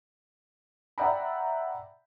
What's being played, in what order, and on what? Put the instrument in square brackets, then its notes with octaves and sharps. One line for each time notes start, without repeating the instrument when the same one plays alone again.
[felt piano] D5 E5 F#5 G5 A#5 B5